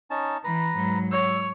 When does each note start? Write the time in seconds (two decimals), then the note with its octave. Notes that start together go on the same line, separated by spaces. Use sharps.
0.11 C#4 D#4 A5
0.44 E3 B4 A#5
0.75 G#2 F#3
1.11 C#5 E6